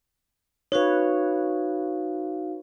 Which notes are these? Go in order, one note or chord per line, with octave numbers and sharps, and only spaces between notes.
D#4 F#4 B4 C#5 F5